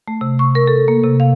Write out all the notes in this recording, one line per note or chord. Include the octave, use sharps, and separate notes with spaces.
A3
C3
C#6
A#4
A4
A#3
C3
F5